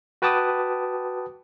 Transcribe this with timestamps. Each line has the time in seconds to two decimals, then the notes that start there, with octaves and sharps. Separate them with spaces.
0.22 F#4 B4 G5 A5 D6 D#6